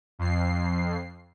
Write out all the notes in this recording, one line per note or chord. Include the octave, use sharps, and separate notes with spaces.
F2 C7